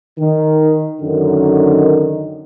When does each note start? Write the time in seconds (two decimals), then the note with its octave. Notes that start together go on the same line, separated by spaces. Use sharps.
0.19 D#3
1.01 F#2 D3 D#3